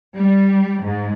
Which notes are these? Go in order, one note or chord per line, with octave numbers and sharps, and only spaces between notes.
G3
G#2